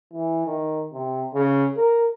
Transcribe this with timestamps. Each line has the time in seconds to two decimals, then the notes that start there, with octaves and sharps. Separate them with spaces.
0.13 E3
0.46 D#3
0.93 C3
1.34 C#3
1.77 A#4